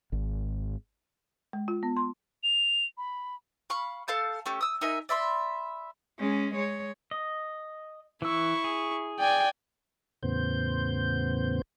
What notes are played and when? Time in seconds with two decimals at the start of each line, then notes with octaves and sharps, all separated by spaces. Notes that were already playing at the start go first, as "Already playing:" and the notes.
0.12 G#1
1.53 G#3
1.68 F4
1.83 B3
1.97 C6
2.43 F7
2.98 B5
3.70 F5 B5 C#6
4.08 A4 F5 A5 G6
4.46 A3 C#4 G4
4.61 D#6 E6
4.81 D#4 A#4 E5 G#5
5.09 D5 E5 B5 C6
6.19 G#3 C#4
6.55 G#3 C#5
7.11 D#5
8.22 E3 E4 C#6 E6
8.64 G#4
9.20 D5 G5 G#5
10.23 E2 A2 C#3 B3 C5 G6